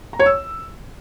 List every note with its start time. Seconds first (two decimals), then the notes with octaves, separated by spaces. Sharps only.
0.13 A#5
0.19 C#5
0.26 E6